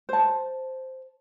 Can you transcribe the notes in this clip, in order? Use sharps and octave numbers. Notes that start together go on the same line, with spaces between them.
C5 A5